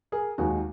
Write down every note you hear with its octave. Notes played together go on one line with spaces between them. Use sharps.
G#4 A#4
D#2 D#3 G#3 F#4 G#4